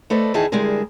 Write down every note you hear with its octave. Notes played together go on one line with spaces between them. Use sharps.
A3 A4 B4 C5 D5 D#5
E2 D#3 D#4 E4 G#4 A5
D3 G3 G#3 E4 G#4 A#4